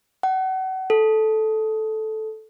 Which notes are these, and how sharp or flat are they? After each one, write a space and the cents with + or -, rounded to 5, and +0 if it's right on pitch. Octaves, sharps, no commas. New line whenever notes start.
F#5 +35
A4 -10